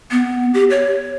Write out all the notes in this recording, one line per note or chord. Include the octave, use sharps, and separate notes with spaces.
B3
G4
C#5